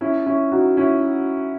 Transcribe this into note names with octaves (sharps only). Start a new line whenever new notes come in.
C#4 E4
C#4 E4
D#4 F#4
C#4 E4